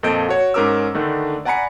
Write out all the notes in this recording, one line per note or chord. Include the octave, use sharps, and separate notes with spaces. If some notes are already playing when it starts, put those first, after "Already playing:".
F2 A#2 A4 D#5 G6 D7
F#4 C#5
G#2 C#4 A#4 D6 E6
D3 D#3 A3 D4
D5 F#5 G#5 A#5 B5 C#7